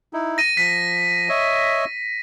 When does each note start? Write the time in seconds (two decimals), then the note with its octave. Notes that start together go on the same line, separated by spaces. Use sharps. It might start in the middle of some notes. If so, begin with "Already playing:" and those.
0.13 D#4 E4
0.38 A#6 D#7
0.57 F3 B6
1.29 C#5 D#5 E5